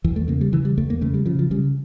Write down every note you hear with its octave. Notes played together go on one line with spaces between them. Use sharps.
E2 E3
A3
C#3 A#3
G3
C#3 E3
G3
E2 A3
A#3
C#3 A3
G3
C#3 F3
F3
C#3 G3